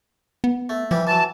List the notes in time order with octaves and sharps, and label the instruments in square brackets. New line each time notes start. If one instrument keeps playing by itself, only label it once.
[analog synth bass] B3
[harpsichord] A3
[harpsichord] E3 G3 G4 [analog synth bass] F3
[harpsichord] E3 F#3 [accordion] A5